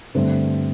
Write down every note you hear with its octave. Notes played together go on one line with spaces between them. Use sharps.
G2 D3 A3 C4 C5